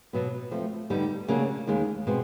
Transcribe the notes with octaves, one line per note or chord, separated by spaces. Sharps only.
B2 F#3 B3
F3 A3 C4
D3 G3 B3 D#4 G4
C#3 F#3 A#3 D4
D#2 D#3 G#3
B2 G#3 C4